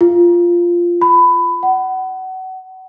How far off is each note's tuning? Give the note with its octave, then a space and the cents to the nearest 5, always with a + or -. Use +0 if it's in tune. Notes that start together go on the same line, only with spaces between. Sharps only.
F4 -5
B5 +20
F#5 +30